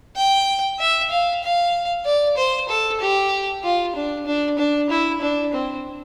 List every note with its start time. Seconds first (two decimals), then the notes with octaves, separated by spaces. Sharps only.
0.16 G5
0.79 E5
1.11 F5
1.43 F5
2.05 D5
2.37 C5
2.69 A4
3.01 G4
3.63 F4
3.95 D4
4.26 D4
4.58 D4
4.90 E4
5.22 D4
5.53 C4